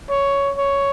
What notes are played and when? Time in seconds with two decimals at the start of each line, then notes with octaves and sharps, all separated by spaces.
0.10 C#5
0.58 C#5